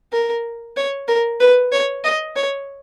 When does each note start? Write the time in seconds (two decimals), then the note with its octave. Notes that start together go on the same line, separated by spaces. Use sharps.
0.12 A#4
0.76 C#5
1.08 A#4
1.40 B4
1.72 C#5
2.04 D#5
2.36 C#5